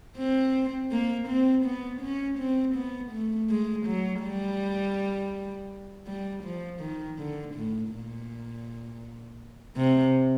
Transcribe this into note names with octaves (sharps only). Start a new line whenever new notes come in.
C4
A#3
C4
B3
C#4
C4
B3
A3
G#3
F#3
G3
G3
F3
D#3
D3
A2
A#2
C3